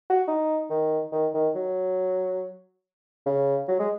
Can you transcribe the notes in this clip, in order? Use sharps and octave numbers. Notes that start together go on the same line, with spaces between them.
F#4
D#4
D#3
D#3
D#3
F#3
C#3
F#3
G#3